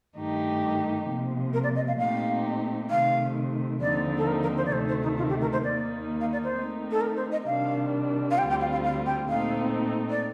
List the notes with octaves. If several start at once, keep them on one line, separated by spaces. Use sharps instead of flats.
G2 D#3 A3 D#4 G4
C3 F3 A#3
A#4
D5
D#5
F5
A#2 A3 C4 D#4 G4 F5
C3 D#3 A3 F5
D#2 D3 F3 C4 D#4 D5
A4
A#4
A#4
C5
D5
D2 C3 D#3 A3 C5
C5
D#4
F4
G4
A#4
C5
D#2 D#3 A#3 D#4 D5
F5
D5
C5
D#3 A3 C4 D#4
A4
A#4
C5
D#5
C3 D#3 G3 D4 F5
F5
D2 D3 G3 C4 F4 G5
G5
F5
F5
F5
G5
A#2 A3 C4 D#4 F5
D5